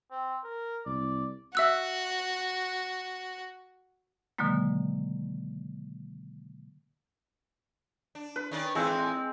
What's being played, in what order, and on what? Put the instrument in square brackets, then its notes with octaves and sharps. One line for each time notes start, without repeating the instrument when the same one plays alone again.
[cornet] C4
A#4
[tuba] C2 [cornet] D5
[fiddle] F#4 [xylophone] E5 E6 F#6
[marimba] B2 D3 D#3 F#3 G#3 A#3
[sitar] D4
[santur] B4
[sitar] D#3 C#4 D5
[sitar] A2 E3 D#4 [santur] G#3 C4